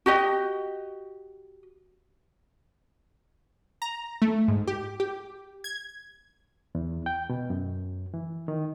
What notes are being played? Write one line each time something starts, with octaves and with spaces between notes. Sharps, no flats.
F#4 G4 D#5
A#5
A3
G#2
G4
G4
G#6
E2
G5
B2
F#2
E3
D#3